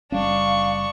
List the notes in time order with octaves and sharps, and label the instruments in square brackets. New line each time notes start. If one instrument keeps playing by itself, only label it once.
[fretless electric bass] F#1 G3 C#4 [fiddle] D4 C#6 [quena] F5